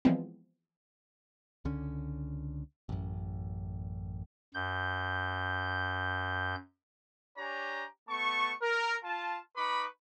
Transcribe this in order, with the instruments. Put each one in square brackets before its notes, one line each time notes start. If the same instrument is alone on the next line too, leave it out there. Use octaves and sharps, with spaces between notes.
[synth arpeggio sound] E3 F3 G3 G#3 B3 C4
[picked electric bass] C#2 D3 C#4
A1 F#2
[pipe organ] F#2 G6
[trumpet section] D4 G4 C#5 G#5 A#5
A3 B3 A5 C#6
A#4
F4 A5
D#4 B4 B5 C#6 D6